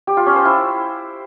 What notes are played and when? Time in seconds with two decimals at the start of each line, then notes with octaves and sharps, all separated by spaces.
0.07 G4
0.17 F4
0.26 C#4
0.36 C5
0.45 E4